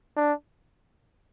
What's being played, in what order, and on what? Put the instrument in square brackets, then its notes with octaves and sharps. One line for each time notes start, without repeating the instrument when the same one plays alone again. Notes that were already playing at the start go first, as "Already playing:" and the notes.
[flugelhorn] D4